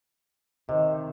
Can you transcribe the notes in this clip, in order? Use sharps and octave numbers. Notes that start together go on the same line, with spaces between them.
C3 D#3 D#5